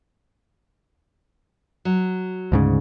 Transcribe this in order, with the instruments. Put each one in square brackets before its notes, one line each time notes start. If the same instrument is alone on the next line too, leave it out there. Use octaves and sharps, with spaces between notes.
[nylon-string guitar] F#3
[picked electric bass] D2 G#2 C#3